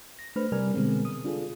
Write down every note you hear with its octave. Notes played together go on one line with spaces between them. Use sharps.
A#6
A3 D4 B4 C5 B5 F6
C3 G3 A#4 D5 G#5 F6
B2 D3 G#3 B3 C4
D#6
D4 F4 G#4 A4